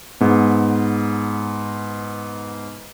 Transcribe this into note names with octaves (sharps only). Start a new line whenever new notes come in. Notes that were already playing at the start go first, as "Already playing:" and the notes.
G#2 B3